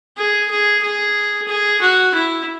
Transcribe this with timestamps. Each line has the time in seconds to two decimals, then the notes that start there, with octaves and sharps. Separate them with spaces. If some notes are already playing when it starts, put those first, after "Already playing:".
0.17 G#4
0.51 G#4
0.83 G#4
1.48 G#4
1.81 F#4
2.14 E4